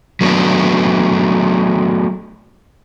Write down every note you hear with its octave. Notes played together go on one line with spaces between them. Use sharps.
F#3 A3 B3 D4